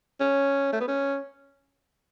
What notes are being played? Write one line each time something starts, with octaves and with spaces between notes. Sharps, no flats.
C#4
A3
B3
C#4